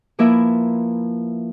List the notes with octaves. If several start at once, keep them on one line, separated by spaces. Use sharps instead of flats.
F3 A#3 E4 A#4 B4 E5